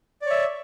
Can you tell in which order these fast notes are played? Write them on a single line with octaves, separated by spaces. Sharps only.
D5 C#5 E5